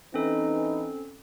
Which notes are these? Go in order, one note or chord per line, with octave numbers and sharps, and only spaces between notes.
E3 C4 C#4 D#4 A4 B4